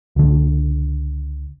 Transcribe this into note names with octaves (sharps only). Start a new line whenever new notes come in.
C#2 D3